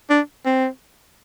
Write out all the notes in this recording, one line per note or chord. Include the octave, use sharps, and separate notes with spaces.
D4
C4